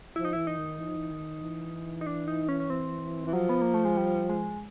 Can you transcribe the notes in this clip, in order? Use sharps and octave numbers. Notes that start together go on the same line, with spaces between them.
F3 E4
D#4
E3 E4
D#4
D#3
E3
F3
E3
D#3
E3
D#4
D4
D#4
C#4
C#4
C4
E3
F3 F#3
B3
A#3
A3
G#3
G3
G#3